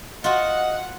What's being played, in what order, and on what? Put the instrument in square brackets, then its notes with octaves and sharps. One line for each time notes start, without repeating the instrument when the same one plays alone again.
[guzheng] F4 F#4 [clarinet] D#5 [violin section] F#5